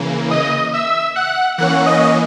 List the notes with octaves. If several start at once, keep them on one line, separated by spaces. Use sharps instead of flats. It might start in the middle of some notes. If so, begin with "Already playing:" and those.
Already playing: C#3 E3 A#3
D#5 D#6
E5 E6
F#5 F#6
E3 A#3 C#4 F#5 F#6
D#5 D#6